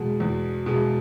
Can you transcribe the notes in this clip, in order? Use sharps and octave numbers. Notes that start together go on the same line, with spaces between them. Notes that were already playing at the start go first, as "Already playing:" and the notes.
Already playing: E2 B2 G#3
E2
B2 G#3